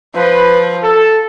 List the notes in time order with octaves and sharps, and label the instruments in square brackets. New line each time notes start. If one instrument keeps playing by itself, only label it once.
[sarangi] F3 [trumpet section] B4
[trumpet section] A4